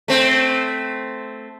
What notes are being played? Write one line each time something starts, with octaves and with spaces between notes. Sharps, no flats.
A3 C4